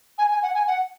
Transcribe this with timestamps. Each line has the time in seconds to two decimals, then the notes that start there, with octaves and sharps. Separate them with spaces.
0.18 G#5
0.31 G#5
0.42 F#5
0.55 G#5
0.67 F#5